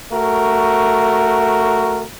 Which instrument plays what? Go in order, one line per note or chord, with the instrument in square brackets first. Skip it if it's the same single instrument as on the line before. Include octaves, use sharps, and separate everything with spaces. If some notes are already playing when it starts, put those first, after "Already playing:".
[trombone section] A3 F#4 A#4